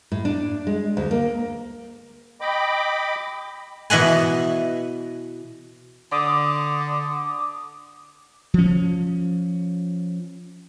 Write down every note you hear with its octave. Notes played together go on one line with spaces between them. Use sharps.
A2
D4
G#3
D2
A#3
D#5 G5 B5 D6
B2 E3 D#5 F#5 G#5
D3 D6 D#6
F3 C#4